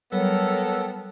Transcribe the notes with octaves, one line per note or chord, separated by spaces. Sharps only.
F#3 G3 B3 A4 A#4 C#5 G5